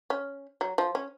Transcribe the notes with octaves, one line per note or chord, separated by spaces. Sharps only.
C#4
F#3
F3
C#4